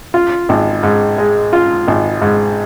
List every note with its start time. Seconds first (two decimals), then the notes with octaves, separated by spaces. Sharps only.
0.14 F4
0.49 G#1
0.83 G#2
1.18 G#3
1.53 F4
1.88 G#1
2.22 G#2